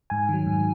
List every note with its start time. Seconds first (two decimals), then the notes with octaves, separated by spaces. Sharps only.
0.10 G#2 G#5
0.29 D#3 F#3
0.46 G#2